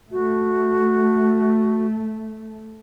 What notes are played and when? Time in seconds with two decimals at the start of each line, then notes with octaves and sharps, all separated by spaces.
0.12 A3 F#4